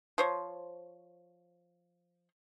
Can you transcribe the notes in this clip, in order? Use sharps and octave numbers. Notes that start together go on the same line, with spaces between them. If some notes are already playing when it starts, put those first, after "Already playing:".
F3 C5 C#5